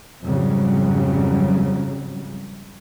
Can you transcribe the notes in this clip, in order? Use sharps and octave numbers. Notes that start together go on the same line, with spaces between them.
F2 G#2 C#3 F#3 G3